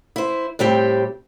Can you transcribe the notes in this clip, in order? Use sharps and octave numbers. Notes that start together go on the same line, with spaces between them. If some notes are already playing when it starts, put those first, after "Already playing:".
E4 C5
A2 G3 C4 G4